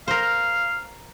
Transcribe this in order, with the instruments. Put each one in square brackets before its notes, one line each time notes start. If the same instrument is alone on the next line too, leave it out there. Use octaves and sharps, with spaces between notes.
[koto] A#4 C5 [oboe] F5